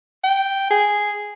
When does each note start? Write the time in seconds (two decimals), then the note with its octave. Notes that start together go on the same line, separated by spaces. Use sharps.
0.24 G5
0.70 G#4